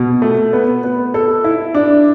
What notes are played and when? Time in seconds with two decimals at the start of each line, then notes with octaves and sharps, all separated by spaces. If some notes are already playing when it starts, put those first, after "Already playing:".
Already playing: B2
0.22 A3
0.53 B3
0.84 B3
1.14 A4
1.44 E4
1.74 D4